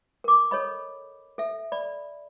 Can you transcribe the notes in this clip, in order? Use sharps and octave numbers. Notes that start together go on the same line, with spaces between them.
A#4 D6
A4 C#5 D#5 B5
A4 E5
D5 B5